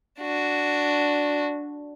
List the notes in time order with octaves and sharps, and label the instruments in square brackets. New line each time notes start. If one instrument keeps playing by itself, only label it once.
[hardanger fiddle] D4 F#4